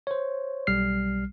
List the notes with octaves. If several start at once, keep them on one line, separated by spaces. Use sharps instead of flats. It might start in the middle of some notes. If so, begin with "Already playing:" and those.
C5 C#5
B1 G3 F6 C7